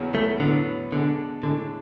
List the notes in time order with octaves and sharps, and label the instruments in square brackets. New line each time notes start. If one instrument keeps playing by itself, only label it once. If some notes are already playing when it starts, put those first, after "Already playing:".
Already playing: [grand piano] E2 C#3 F#3 B3
[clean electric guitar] A3
[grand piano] A2 F#3 B3 [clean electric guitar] D3
[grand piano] B2 G#3 D4 [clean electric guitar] D3
[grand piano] A2 G#3 D4 [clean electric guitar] D3